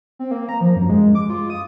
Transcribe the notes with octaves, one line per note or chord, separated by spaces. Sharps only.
C4
A#3
A#5
F3
F#2
G#3
D6
F4
D#6